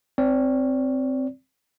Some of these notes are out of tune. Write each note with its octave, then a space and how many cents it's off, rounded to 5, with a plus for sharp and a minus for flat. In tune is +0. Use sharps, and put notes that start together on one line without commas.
C4 +0 D5 -35